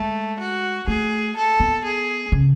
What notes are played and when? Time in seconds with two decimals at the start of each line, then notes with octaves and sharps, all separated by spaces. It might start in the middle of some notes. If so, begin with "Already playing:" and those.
Already playing: G#3 A3
0.40 F#4
0.88 A3 G#4
1.37 A4
1.60 B3
1.84 G#4
2.32 C#3